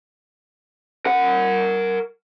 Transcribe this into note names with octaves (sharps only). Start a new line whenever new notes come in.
A#4 F#5